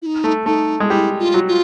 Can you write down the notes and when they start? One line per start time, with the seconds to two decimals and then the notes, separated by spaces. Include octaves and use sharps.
0.02 E4
0.06 D#4
0.24 A3
0.46 A3 D#4
0.80 G#3
0.89 G3 E4
1.19 F4
1.34 F#3
1.48 F4